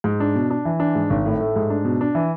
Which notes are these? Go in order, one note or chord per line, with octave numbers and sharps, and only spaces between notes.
G#2
D4
B2
D4
E3
D4
G#2
G#1
A2
A3
G#2
D4
B2
D4
E3